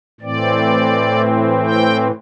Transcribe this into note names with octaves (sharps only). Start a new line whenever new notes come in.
A2 E3 C4 D5
G5